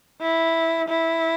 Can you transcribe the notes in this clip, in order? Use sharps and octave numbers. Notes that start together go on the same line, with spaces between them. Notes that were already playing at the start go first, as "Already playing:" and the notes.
E4
E4